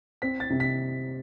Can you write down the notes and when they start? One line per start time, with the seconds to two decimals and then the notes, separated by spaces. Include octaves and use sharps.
0.22 C4 B6
0.40 A6
0.50 C3
0.60 B6